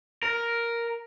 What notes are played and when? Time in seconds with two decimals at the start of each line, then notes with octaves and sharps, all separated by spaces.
0.23 A#4